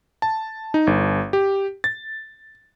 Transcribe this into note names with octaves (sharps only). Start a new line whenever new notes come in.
A5
D#4
G1
G4
A6